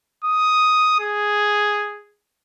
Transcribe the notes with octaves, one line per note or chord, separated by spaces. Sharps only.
D#6
G#4